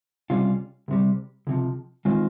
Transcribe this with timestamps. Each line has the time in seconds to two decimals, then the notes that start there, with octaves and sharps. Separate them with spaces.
0.30 C#2 C3 G3 C#4 F4
0.88 C2 C3 G3
1.47 C#2 C3 F3
2.05 D#3 G#3 C4 F4